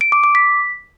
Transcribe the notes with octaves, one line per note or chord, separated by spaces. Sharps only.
D7
D6
D6
B6